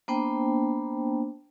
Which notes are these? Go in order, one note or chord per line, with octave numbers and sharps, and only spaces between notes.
A#3 B3 D4 C5 G5 A5